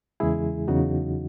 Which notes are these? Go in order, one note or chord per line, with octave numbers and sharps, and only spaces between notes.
E2 C#3 E3 G#3 E4 G#4
E2 C#3 F#3 D#4 F#4